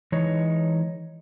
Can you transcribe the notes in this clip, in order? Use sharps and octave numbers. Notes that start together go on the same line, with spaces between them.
E3 G#3 D#4 C#5